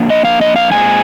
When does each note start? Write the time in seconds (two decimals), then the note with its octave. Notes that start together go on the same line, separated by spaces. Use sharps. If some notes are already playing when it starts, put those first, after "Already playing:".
Already playing: F2 A#3 D4
0.10 D#5
0.25 F5
0.41 D#5
0.56 F5
0.72 A#2 G#3 C4 G#5